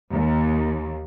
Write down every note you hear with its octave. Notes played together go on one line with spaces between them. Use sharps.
D#2